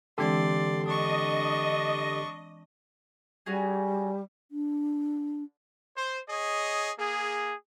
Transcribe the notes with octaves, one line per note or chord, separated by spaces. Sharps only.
D3 E3 G#3 C4 G4 A4 D5 C6
D4 D#5 C#6 D#6
G3 C#4 F#4 G#4
D4
C5
G#4 C#5 D#5
A#3 G#4